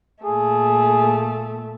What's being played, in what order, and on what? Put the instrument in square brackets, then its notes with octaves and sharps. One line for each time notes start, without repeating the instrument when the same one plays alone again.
[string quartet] A#2 A3 [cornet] G#4